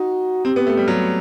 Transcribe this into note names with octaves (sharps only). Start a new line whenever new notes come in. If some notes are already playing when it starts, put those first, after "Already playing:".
Already playing: D#4 F#4
C4 G4
B3
A3
G3
F#3